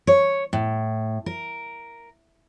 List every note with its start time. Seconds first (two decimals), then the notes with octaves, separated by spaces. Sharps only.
0.07 C#5
0.53 A2
1.26 A#4